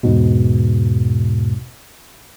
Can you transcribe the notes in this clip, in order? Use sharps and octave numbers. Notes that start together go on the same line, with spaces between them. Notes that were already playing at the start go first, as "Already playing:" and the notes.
E2 G#2 B2